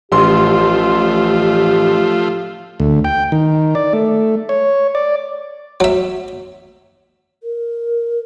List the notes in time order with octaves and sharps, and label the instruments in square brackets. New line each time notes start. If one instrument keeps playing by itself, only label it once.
[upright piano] A1 C6 [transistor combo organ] F3 A3 F4 [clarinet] G4
[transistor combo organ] D2
G5
D#3
D5
A3
C#5
D5
[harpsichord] F#3 E5
[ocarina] A#4